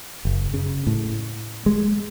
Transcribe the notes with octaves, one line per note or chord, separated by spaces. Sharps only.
F#1
C#3
A2
G#3